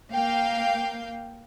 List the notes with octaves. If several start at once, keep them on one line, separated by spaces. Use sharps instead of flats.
A#3 F5 G5